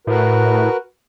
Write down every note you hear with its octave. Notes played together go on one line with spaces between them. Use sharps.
A2 F#4 A#4 B4